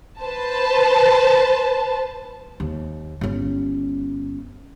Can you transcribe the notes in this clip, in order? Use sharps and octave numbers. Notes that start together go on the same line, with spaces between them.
B4 C5 A5
D#2
G1 C#4